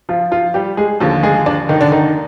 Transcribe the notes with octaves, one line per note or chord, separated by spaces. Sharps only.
F3 F4
F3 F4
G3 G4
G#3 G#4
D#2 D3 F3
G#3 G#4
D4 D5
D#3 D#4
D3 D4
D#3 D#4